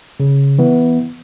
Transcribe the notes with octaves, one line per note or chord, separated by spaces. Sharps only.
C#3
E3 B3